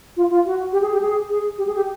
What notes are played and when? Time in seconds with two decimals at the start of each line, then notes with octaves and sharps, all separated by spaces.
0.17 F4
0.31 F4
0.46 F#4
0.73 G4
0.82 G#4
0.93 G4
1.02 G#4
1.30 G#4
1.58 G4
1.67 G#4
1.76 G4